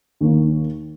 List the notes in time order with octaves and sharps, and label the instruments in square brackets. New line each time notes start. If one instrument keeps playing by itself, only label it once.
[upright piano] D#2 D#3 A#3